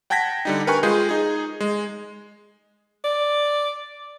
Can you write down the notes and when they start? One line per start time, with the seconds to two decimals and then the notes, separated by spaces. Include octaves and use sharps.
0.10 F#5 G5 A5 G#6 A#6 B6
0.45 D3 G3 D#4
0.67 A#4 B4 G5 G#5 C#6
0.83 G#3 F4 G#4 G6
1.09 D#4 G#4
1.60 G#3
3.04 D5